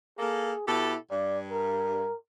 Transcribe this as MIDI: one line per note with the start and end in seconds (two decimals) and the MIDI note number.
0.19 0.52 58
0.19 0.67 68
0.19 0.52 69
0.67 0.95 47
0.67 0.98 64
0.67 0.95 67
0.67 0.95 69
1.11 2.06 43
1.11 1.39 74
1.50 2.15 70